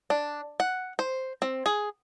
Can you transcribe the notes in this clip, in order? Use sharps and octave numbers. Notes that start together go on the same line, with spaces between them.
D4
F#5
C5
C4
G#4